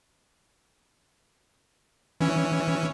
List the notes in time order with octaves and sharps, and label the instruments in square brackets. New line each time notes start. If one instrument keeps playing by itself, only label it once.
[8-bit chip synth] E3 C#4